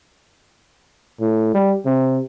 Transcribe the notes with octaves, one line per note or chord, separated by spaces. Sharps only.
A2
G3
C3